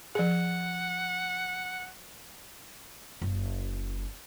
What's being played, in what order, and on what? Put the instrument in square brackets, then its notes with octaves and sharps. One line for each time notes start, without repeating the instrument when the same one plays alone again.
[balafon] F3 G#4 [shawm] F#5
[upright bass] F#1